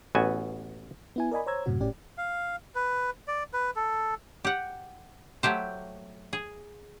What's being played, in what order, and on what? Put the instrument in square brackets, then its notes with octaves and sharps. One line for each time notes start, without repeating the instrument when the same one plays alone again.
[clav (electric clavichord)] A1 B3 F#4 G#5
[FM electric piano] B3 E4 G#5
A#4 D5 D#5 G#5 B5
C5 C#5 A#5 E6 G#6
F#2 A2 C3 F#4
G1 A2 C#4 G4 D5
[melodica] F5
B4
D5
B4
A4
[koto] G4 F#5
F#3 A3 G4 C5
G#4